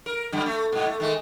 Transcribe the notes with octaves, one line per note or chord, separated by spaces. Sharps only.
A#4
F#2 D3 G3
A3
G#2 B2
A3
D#3 G#3 A3